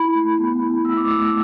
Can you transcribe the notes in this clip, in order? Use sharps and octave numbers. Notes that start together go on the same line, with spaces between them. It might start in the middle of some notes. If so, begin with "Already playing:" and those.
Already playing: E4 B5
A3
B3
E4
A3 E6
D6
A3 E6